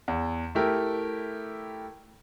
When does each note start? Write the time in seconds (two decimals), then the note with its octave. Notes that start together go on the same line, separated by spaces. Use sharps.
0.08 E2
0.55 A3 E4 G4 A#4